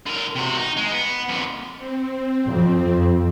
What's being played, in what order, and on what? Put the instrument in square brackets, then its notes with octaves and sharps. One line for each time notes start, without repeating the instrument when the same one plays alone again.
[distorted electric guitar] D3 A#4
C3 F#4
D#4
G#3
B3
F2 D3
[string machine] C4
[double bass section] F2